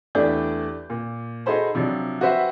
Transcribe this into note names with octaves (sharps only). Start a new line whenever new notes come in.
E2 A3 D4 G4 D5 G6
A#2
D#4 F#4 G#4 A4 C5 B5
C3 F3 F#3 D4
F#4 G4 B4 C5 E5 F#5